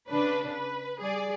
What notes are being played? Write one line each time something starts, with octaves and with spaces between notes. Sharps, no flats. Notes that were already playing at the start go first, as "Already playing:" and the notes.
C#3 D4 B4
B4
G3 G#4 D5